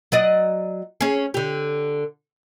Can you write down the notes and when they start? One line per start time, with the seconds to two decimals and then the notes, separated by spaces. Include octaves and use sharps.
0.12 F#3 D5 D#5
1.01 C#4 G#4
1.34 D3 G4